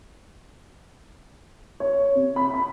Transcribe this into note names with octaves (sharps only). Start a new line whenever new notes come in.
C#5
C3
B5
B5